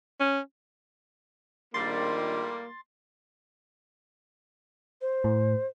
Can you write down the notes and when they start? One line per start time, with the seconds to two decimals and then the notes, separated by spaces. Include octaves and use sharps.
0.20 C#4
1.74 A#1 A2 D#3 G3 A#3 C6 A6
5.01 C5
5.24 A2